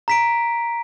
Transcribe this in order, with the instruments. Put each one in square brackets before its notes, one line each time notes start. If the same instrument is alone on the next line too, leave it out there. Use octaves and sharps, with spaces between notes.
[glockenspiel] A#5 B6 D7